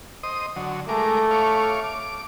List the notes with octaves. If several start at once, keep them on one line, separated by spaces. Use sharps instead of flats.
C5 D#5 D#6
D3 F#3
G#3 A3 A#4 D6
C#5 F5 D6
D6